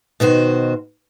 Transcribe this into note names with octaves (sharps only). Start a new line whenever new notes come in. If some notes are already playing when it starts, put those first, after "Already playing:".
B2 D#3 F#4 C5